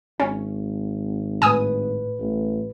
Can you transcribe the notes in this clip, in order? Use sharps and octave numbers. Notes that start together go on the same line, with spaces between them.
G#1 C#4
A2 B4 G#5 D#6
A1